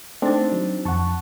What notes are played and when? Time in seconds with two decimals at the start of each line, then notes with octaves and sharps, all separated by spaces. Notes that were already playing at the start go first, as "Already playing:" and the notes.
0.22 A3 C4 D4 D#4 A6
0.52 F#3
0.85 F2 F#5 A5 C#6